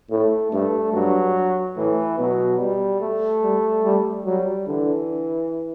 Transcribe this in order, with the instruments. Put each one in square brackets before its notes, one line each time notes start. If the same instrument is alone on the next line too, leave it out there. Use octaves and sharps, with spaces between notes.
[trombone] A2 [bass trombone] A3
[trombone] G2 [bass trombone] A3
[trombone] G2 [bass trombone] F#3
[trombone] A2 [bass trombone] E3
[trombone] B2 [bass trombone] F#3
[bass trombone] G3
A3
[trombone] G3
G3
[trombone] F#3 [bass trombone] G3
[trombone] D3 [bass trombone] E3